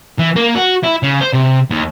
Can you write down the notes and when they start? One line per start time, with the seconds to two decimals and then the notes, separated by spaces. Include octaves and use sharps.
0.19 E3
0.36 A#3
0.55 F#4
0.83 E4
1.03 C#3
1.21 C5
1.33 C3
1.70 D#2